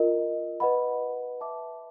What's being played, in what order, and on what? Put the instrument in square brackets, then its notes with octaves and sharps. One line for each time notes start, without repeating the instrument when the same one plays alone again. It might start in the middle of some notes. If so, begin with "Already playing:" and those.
Already playing: [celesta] F4 A#4 D#5
B4 D#5 F#5 B5
B4 E5 A5 D6